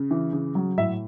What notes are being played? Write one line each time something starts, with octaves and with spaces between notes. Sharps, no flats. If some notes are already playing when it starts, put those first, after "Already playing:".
Already playing: C#3
E3
C#3
F#3
A2 E5